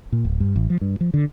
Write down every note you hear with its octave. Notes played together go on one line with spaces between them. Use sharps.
A#2
D1
G2
A1
F3
G2
F3
D3